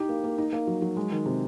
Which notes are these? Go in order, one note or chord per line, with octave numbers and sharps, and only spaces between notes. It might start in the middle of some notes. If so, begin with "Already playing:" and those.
Already playing: D#4 E4 G4
A#3
A#3
D#4
A#3
F#3
F#3
G#3
D#3
C3